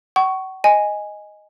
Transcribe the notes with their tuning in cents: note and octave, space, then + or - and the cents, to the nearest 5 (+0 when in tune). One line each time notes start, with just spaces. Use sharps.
F#5 +40 C#6 +0
D#5 +0 G#5 -5